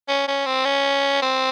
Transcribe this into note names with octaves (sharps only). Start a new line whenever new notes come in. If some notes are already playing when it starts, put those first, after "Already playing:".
C#4
C#4
C4
C#4
C4